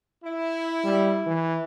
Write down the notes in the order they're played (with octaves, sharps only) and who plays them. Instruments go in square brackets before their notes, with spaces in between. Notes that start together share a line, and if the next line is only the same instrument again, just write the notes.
[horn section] E4
[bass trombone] G3
E3